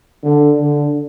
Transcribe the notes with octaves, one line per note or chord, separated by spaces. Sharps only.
D3
D3